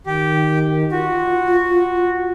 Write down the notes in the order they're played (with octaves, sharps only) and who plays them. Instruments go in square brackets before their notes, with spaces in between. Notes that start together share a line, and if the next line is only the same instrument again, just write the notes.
[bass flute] D#3 [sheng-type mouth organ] G4
[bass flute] F4 [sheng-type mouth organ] F#4